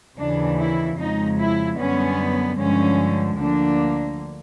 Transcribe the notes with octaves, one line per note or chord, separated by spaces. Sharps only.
D#2 C#3 E3 D4
E4
F2 C#3 F3 G#3 D#4
E4
F#2 D3 G3 B3 C#4
G2 D3 F3 G#3 C#4
D2 D3 F3 A#3 D4